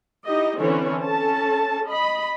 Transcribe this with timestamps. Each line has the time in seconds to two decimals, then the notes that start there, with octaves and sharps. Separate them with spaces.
0.25 D#4 E4 G4 D#5
0.58 D3 E3 C4 C#4 A4 C#5
1.04 C#4 A4 A5
1.87 D#5 B5